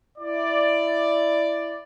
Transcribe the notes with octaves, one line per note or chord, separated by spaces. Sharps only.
E4 D5